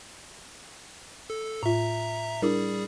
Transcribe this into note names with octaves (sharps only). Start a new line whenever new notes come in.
A4
A2 F4 E5 A#5
G3 D4 E4 G#4 A#4